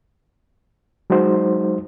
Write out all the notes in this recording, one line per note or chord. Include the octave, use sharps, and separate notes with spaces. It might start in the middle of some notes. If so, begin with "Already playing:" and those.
F#3 G#3 D#4 F#4 C5